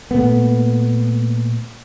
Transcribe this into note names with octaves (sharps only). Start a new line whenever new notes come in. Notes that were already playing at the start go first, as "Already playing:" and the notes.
A#2 A3 B3